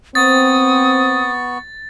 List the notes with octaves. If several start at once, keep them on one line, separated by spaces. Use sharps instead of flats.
B3 C4 C#6 D#6 A6